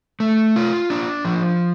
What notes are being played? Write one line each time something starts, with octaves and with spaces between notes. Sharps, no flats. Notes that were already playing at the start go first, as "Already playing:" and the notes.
A3
F4
D4
F3